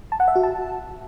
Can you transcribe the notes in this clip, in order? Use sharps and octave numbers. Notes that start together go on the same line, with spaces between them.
A5
F#5
E5
F#4
A5